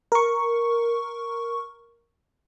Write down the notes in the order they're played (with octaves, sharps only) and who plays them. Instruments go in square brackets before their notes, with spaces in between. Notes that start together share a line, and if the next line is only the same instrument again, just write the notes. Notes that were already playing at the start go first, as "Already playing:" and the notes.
[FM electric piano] A#4 C#6